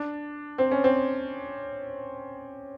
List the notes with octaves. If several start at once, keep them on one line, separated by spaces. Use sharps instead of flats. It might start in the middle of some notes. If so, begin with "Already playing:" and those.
Already playing: D4
C4
C#4
C4